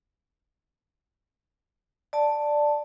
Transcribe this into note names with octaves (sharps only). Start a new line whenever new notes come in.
D5 A5